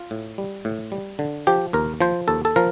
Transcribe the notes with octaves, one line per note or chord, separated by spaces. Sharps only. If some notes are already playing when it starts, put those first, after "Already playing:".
Already playing: F4
A2
G3
A2
G3
D3
F3 G4
D#2 A#4
F3 C5
D#2 A4
A4
F3 A#4